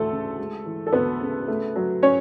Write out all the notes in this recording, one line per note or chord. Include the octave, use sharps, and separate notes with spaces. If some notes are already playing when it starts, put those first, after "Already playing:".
Already playing: D2 E3 A3 A4
C#3
G#3
E3
A4
D2 B3 B4
C#3
A3
F#3
C#4 C#5